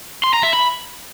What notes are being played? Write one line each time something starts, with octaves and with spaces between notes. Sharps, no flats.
C6
A#5
E5
B5